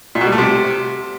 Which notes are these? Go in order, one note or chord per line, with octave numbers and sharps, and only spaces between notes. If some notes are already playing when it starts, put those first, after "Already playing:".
A#2
B2
G3
A3
C3